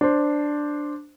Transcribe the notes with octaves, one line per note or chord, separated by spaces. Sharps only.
D4 C5